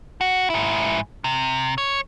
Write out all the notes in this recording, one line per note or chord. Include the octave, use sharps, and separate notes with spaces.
F#4
G#2 E4
C3
C#5